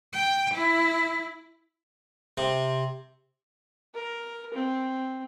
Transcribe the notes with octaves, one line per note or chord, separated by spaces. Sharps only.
G5
E4
C3
A#4
C4